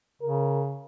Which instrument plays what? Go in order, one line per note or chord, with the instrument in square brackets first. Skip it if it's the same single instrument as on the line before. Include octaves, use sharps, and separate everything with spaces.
[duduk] C#3 [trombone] A#4